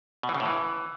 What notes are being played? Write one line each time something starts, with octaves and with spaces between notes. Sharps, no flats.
B2
E3
C#3
A2
E3